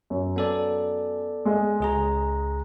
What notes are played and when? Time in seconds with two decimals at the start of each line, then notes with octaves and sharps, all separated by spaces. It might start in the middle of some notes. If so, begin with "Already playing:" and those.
0.10 F#2
0.36 B3 A4 D5
1.45 G#3 D#5
1.80 C#2 G#4 A#5